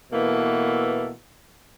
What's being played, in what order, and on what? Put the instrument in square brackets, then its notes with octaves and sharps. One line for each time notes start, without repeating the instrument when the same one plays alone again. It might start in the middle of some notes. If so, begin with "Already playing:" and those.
[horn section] B2 E3 A3 A#3